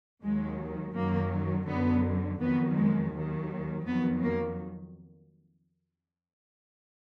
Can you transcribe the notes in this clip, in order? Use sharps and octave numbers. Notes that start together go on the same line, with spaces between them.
D#2 D#3 F#3 G#3
F#2 D#3 F#3 A#3
F#2 D3 F#3 B3
F2 D#3 F#3 B3
G#3
D#2 D#3 F#3
F2 D#3 F#3 B3
A#3